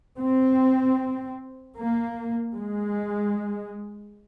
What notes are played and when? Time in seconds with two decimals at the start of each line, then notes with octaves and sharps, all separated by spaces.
0.17 C4
1.76 A#3
2.56 G#3